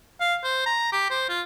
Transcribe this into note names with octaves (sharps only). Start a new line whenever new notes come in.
F5
C5
A#5
G4
C5
F4